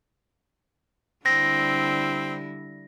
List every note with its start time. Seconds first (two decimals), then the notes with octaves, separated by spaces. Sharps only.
1.26 D3 G3 C4 E4 A#6